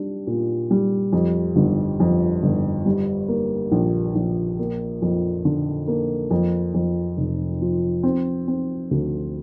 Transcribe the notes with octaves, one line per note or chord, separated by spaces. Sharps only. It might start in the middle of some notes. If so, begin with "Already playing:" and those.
Already playing: G3 D4
A#2
G3
F2
G1
F2
G1
G3
A#3
A#1
A#1
A#3
F2
D3
A#3
F2
F2
F1
F3
C4
C4
D2